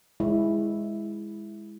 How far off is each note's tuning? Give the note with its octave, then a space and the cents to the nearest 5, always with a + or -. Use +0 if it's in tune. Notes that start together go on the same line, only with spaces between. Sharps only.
G#3 -5 E4 +0